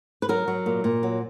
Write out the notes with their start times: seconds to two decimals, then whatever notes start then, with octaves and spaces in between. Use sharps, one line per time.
0.22 B4
0.29 F#3 A#4
0.48 F#3
0.66 A#2
0.84 A#2
1.03 F#3